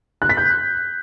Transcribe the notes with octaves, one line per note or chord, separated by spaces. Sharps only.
F#6
B6
G6